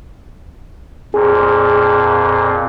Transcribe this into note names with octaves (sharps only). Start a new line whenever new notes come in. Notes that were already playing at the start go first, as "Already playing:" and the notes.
F2 A#2 G#4